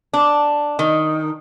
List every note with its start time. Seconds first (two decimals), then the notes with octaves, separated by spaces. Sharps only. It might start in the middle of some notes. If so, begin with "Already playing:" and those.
0.13 D4
0.79 D#3